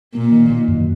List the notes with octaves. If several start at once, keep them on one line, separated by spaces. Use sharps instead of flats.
A#2 A#3
D#3
D#3
F#2